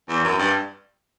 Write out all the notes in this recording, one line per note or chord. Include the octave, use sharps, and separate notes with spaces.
E2
F#2
G2